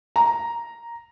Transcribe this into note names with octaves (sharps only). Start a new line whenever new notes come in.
A#5